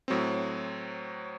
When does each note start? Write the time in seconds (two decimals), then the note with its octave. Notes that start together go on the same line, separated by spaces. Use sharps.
0.08 A2 F#3 C4